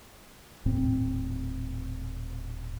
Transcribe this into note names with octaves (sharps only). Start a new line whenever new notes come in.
D#1 A2 C4